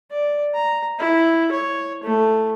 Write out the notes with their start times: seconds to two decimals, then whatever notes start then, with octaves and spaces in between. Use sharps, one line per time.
0.11 D5
0.54 A#5
0.99 E4
1.52 C#5
2.04 A3